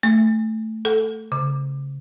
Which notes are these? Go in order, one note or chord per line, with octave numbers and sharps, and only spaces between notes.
A3
A4
C#3